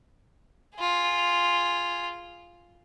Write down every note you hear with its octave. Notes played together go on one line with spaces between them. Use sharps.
F4 G#4